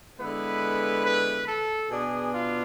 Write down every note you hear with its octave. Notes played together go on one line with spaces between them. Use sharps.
D3 G#3 B3 E4 B4
B4
A4
B2 B3 D4 G#4
F4